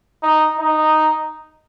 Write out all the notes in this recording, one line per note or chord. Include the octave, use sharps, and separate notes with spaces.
D#4
D#4